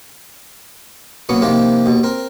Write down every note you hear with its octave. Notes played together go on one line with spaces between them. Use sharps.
A#2 F#3 B3 C#4
C3 D#3 F3 A#3 C4
D#2 B2
C4 A#4